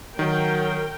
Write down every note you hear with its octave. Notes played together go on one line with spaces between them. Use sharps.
D#3 F#3 A#4 G5